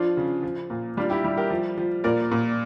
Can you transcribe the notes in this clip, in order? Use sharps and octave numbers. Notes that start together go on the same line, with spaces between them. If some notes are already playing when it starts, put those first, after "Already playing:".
Already playing: F3 D4 F4
C#3
F3
A#2
G3 D4 F4
E4 G4
G3
G4 A#4
F3
F3
A#2 A#4 D5
A#2